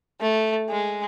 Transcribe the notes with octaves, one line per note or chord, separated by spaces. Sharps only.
A3
G#3